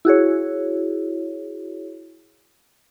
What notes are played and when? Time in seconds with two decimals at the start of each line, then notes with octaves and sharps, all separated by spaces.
0.05 E4 F#4 G#4 C#5